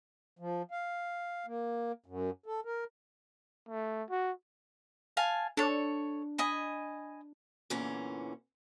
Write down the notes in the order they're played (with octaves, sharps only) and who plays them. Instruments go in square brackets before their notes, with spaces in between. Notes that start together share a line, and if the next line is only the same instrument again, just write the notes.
[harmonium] F3
F5
A#3
F#2
A4
A#4
[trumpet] A3
F#4
[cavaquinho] F5 G#5 A5
[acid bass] D4 [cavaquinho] A4 C#5
[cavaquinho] D#5 G#5 B5
[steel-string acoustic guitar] E2 A#2 D3 E3 C#4